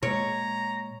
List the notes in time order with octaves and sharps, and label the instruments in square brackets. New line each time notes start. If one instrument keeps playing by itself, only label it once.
[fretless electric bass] A#2 G#3 [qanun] C#5 [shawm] A#5